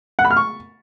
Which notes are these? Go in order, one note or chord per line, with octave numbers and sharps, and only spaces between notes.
F#5
B5
F6
C#6